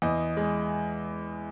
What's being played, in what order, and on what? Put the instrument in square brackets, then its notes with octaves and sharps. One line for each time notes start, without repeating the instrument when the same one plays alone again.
[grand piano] E2 D#5
G#3